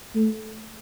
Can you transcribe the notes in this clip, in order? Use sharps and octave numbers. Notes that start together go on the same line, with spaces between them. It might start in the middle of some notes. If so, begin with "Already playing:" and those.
A3